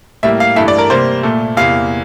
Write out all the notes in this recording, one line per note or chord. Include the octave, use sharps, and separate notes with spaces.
A2 G3 A#3 E5
F5
G2 E3 A3 E5
D5
A#4
C3 G3 A#3 C5
A#2 A3
E2 C3 E3 A#3 F5